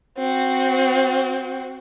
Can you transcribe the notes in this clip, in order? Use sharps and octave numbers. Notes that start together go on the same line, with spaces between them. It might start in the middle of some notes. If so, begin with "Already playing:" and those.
C4 F#4